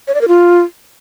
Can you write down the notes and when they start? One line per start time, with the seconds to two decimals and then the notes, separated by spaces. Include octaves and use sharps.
0.08 C#5
0.14 D5
0.21 A#4
0.28 F4